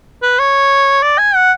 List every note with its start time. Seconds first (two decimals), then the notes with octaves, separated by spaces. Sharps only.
0.22 B4
0.39 C#5
1.03 D5
1.18 G#5
1.35 F#5